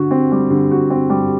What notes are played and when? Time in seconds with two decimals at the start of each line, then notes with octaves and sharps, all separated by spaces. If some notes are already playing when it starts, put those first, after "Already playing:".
Already playing: D3 F#4
0.11 C4
0.32 G3
0.50 D3
0.71 F#4
0.90 C4
1.10 G3